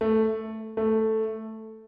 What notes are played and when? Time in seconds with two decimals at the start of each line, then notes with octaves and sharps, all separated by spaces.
0.01 A3
0.77 A3